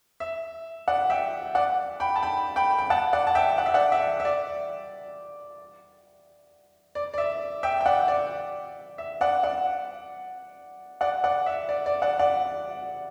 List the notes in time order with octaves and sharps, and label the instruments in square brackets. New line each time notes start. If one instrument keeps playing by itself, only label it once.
[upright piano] E5
D5 F#5
E5 G5
D5 F#5
G5 B5
A5
G5 B5
G5 B5
G5
F#5 A5
D5 F#5
A5
E5 G5
F#5
E5
D5 F#5
E5
E5
D5
D5
D5
E5
E5 G5
G5
D5 F#5
D5
E5
D5 F#5
D5 F#5
D5 F#5
D5 F#5
E5
D5
D5
D5 F#5
D5 F#5